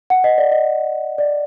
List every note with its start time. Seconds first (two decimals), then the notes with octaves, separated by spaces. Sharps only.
0.10 F#5
0.24 D#5
0.38 D5
0.52 D#5
1.18 D5